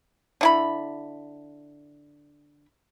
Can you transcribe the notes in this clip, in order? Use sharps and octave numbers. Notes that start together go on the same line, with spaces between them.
D3 E4 B5